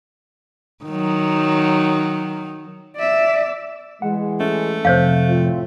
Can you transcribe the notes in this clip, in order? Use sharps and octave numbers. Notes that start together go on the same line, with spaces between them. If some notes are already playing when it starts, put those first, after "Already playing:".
D#3 F#3
D5 E5
E3 G#3 F#5
A3 C#4
F2 C3 C5 C#5 F5
A2 C4 F4